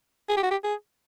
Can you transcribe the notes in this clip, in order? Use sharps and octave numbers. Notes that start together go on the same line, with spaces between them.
G#4
G4
F#4
G4
G#4